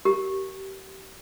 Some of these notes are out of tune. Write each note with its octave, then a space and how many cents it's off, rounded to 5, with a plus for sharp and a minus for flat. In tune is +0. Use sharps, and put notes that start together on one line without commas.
G4 -30 A#4 +0